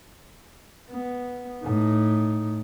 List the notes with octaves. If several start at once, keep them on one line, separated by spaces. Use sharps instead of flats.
B3
A2 D#4